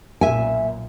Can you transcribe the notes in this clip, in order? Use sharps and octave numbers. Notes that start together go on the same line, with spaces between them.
B1 F#2 A#2 E5 G#5